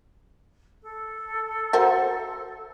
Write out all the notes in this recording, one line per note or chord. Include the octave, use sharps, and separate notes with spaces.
A4
F#4 A#4 C5